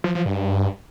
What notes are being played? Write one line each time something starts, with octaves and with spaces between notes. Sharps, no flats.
F3
F3
G2